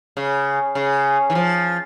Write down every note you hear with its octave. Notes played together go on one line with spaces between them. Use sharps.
C#3
C#3
E3
F3